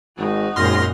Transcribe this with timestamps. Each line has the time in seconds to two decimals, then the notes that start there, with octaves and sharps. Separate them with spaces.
0.17 G#1 D#4 F#4
0.56 G#1 F#2 A#2 F#3 C6 F6 A#6